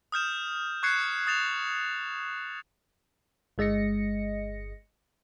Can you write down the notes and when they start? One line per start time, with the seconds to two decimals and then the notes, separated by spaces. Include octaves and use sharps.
0.12 D#6 F6 G6 E7
0.83 C#6 F#6 G#6 C7 C#7
1.27 D#6 A6 E7 F7
3.58 G1 G#3 D#5 A#6 C#7